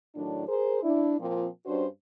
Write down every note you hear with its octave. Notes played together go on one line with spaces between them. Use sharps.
A2 D#3 F#3 D4
G#4 A#4 C5
D4 E4
A#2 F3 C4
G2 C#4 D4 F#4 C5